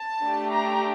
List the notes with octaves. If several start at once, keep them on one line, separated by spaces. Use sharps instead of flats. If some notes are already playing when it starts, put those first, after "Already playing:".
Already playing: A5
A3 D4 G4
A#5